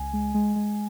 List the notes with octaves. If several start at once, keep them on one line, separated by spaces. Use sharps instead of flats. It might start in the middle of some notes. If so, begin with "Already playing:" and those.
Already playing: C#2 G#5
G#3
G#3
G#3